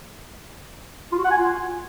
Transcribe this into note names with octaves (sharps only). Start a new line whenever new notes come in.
F4
F#4
F#5
G#5
F4